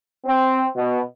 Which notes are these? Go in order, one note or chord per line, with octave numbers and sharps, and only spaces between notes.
C4
B2